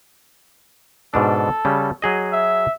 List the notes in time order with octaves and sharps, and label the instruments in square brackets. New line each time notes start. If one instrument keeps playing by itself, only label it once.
[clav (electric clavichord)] G#2 B2 D4 [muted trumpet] A4
[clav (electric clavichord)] C#3 G3
F#3 G#4 D#5
[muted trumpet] E5